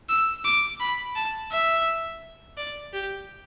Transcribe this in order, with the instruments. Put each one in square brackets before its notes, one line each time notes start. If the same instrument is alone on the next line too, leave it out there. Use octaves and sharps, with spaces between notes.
[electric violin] E6
D6
B5
A5
E5
D5
G4